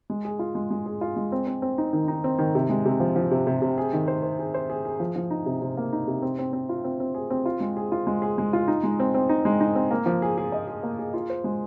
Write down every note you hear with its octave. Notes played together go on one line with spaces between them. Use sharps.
G#3
G#4
F4
G#3
G#3
G#4
F4
G#3
C4
C4
C4
D#4
D#3
D#4
C4
D#3
C3
G#3
C3
F3
F3
C3
C3
C3
G#4
D#3
C5
C5
G#4
C5
G#4
G#4
F3
F3
D#4
C3
C3
A#3
D#4
C3
C4
C4
C4
F4
C4
C4
G#4
C4
F4
G#3
G#4
F4
G#3
G#4
G#3
F4
D#4
G#3
C4
C4
D#4
G#3
D#4
C4
A#3
F3
G#4
G#4
D#5
G#4
A#3
G#4
F4
C5
G#3